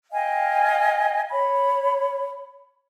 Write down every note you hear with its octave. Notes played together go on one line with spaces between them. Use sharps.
D#5 F5 G5 G#5
C#5 B5